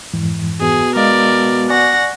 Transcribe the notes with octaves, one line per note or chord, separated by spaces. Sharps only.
F2 G#2 E3
B2 G#4
G#3 A#4 D5 D#5 F5
D5 F#5 G#5 C#6 A#6